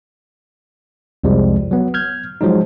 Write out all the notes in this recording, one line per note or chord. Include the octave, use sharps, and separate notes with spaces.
C2 F2 F3 G3 G#3
F#3 B3
F6 G6 G#6
F3 F#3 G#3 D#4